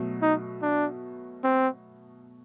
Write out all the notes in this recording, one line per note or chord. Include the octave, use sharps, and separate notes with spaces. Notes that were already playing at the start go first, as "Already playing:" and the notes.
Already playing: B2 F#3 A3
D#4
D4
C4